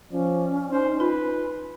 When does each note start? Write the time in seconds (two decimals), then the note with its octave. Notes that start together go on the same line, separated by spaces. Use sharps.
0.12 F3 C#4 D5
0.71 D#4 C5
1.00 F4 B4